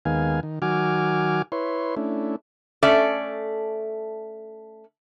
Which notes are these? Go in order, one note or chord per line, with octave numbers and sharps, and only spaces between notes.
D#2 D#3 G#3 B3 F5 G#5
D#3
D#3 F#3 F#4 G#5 D6 F6
E4 B4 C#5 C6
A3 C#4 D4 E4
A3 C#4 A4 D5 E5